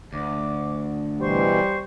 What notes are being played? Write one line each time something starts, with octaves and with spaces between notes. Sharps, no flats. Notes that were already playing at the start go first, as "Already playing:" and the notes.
D2 D6
B2 E3 G3 C5 C6 C#6